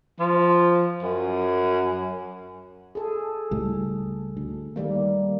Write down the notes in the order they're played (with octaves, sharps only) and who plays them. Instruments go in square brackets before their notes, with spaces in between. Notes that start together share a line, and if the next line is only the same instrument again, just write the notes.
[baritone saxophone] F3
F#2
[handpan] G#4 A4
[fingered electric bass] C#2 A2 G3
D2
[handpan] D#3 G3 A#3